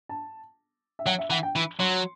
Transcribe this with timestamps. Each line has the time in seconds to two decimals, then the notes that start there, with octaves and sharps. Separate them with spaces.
0.09 A5
0.99 E5
1.06 F#3 F#5
1.19 E5
1.30 E3 F#5
1.43 G5
1.55 E3 B5
1.79 F#3 C6